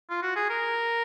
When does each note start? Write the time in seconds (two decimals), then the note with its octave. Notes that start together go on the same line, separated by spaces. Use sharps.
0.10 F4
0.23 F#4
0.36 G#4
0.50 A#4